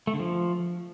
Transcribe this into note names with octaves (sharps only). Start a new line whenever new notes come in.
A3
D3
F3